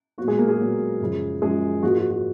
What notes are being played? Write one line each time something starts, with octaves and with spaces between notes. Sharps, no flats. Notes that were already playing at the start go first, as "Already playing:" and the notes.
A#2 F#3 B3 F#4
G#3 G#4
A#3 A#4
G#3 G#4
A#2 F#3 B3
F#2 C#3 F3
F#2 C#3 F3 G#3 G#4
G#2 F3 A#3 F#4
F#4
F#4